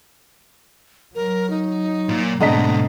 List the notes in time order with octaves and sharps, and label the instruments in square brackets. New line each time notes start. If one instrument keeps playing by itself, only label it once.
[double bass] F#3 [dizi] A#4
[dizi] D#4
[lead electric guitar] A#2
[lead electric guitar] G#2 B2 [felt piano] D3 D#5 B6 [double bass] A3 C4 [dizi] A#5